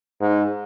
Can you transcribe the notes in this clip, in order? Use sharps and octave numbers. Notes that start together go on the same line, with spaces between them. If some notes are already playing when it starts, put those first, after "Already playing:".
G#2